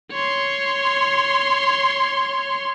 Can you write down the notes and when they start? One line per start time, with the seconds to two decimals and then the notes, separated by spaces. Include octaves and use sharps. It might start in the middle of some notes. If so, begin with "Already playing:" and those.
0.12 C#5 C6